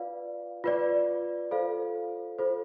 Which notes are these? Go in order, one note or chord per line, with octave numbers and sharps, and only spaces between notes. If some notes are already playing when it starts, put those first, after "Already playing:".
Already playing: F4 B4 D5 F5
F4 B4 D5
F4 A4 C5 F5
F4 A4 C5